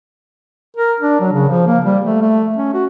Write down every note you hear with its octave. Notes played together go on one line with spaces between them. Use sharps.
A#4
D4
F#3
C#3
F3
A#3
G3
A3
A3
C#4
F#4